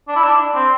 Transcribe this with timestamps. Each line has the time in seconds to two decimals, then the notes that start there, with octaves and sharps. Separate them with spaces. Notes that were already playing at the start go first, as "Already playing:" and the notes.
0.08 D4
0.16 E4
0.23 D4
0.55 C4